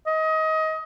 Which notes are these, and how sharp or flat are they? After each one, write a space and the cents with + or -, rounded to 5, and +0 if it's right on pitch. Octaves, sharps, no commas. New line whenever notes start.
D#5 +25